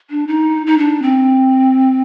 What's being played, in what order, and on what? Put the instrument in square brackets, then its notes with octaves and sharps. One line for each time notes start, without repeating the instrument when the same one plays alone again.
[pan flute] D4
D#4
D#4
D4
C4